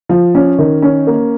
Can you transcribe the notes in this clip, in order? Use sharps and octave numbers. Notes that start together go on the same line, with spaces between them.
F3
C#4
D#3
C#4
A#3